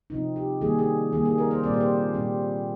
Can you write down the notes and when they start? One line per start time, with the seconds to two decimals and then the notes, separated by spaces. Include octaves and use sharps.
0.10 C3 F3 C4 D#4
0.36 G4
0.61 D#3 G3 A#3 G#4
0.79 G#4
1.12 D#3 G3 A#3 G#4
1.25 G#4
1.38 A#4
1.51 C5
1.63 A#2 G3 C4 D5
1.74 D5
1.80 C5
2.14 A#2 G3 C4